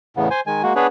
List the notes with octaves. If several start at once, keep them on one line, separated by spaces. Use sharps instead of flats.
E2 A2 C#3 B3
C5 G#5
D#3 G#3 G#5
G#3 A#3 F#4
B3 D4 G#4 B4 C#5